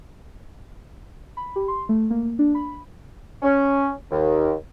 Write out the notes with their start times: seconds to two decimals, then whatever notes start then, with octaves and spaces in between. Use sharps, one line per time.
1.37 B5
1.56 G4
1.68 C6
1.89 A3
2.10 A#3
2.39 D4
2.55 B5
3.42 C#4
4.11 D#2